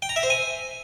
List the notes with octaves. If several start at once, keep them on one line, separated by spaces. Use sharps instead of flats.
G5
A#5
E5
C5
G#5